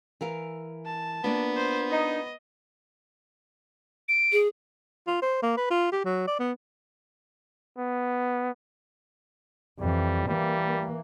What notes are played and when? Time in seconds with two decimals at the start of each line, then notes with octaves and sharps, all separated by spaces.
0.21 E3 A#4 F5
0.86 A5
1.24 A#3 B3 D4 F4
1.56 C5
1.91 D#4 D#5
4.09 D7
4.32 G#4
5.07 F4
5.22 C5
5.43 A#3
5.57 B4
5.71 F4
5.92 G4
6.05 F#3
6.28 D5
6.39 B3
7.78 B3
9.80 F2 E3 G3
10.28 E3 G3 A#3